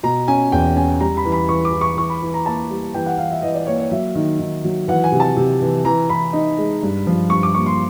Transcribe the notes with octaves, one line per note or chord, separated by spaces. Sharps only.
B2 A#5
C#4 G#5
E2 G5
C#4 G#5
G3 A#5
B5
E3
B5
E3 C#6
D6
E3
C#6
E3 C#6
B5
E3
A#5
A#3 A5
G3
E3 G5
F#5
E3 F5
E5
E3 D#5
D5
A#3 C#5
C#5
F#3 E5
D#3
D#3
F#3
E3 F#5
G#5
C3
A5
C3
E3
E3 A#5
E3 B5
D#4
G#3
G2
F3
G2 C#6
D6
A#3 C#6
C6